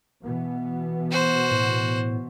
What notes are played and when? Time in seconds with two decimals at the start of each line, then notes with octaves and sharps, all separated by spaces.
0.23 B2 E3 B3
1.11 F#4 C5
1.51 A2